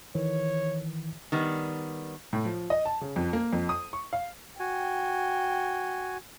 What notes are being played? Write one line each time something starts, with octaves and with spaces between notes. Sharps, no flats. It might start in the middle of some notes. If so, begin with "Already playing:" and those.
D#3 E3 C#5
D#3 G3 B3
A2
F3
D#5
A5
C#3
F2
A#3
F2
D#6
C#6
F5
F#4 G5 G#5